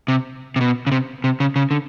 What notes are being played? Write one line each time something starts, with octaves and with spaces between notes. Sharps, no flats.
C3
C3
B2
C#3
C3
C3
C#3
C#3
D3